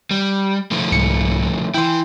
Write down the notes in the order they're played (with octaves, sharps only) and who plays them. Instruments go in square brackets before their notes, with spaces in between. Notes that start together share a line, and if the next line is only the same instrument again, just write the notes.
[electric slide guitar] G3
D3 F3 A3
[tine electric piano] C2 G#2 C#7
[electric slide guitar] E3 E4 [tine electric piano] G5 C6